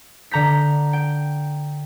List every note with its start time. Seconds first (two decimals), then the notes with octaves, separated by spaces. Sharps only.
0.31 D3 A#5 G6 B6
0.93 G5